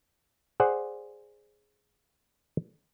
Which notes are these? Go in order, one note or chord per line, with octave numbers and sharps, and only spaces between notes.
G#4 C5 D5 F#5